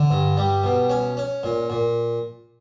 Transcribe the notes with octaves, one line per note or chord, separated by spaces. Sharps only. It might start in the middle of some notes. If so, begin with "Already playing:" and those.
Already playing: D3
G2
G3
B2
C#4
C#4
A#2
A#2